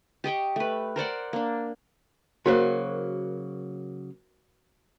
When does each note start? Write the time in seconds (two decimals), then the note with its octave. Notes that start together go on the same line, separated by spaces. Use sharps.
0.24 G4 D#5 G5 C#6
0.56 A3 B4
0.96 A#4 C5 D5 F#5
1.33 A#3 D4
2.46 C#3 F#3 A#3 F#4 A#4 C5